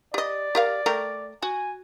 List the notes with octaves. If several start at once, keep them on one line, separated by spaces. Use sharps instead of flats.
G4 D5 D#5
G4 A#4 F5
A3 A#4 G5
F#4 G#5